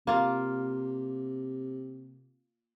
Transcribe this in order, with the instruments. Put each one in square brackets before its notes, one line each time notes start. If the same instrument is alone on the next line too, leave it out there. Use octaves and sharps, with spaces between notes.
[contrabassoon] C3 [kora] A#3 F4